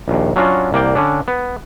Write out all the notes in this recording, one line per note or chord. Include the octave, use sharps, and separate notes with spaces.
A#1 D#2
F#3 C#4 D4 F4 F#4
C2 A#3 D5 G5
D3 C#4 D4
B3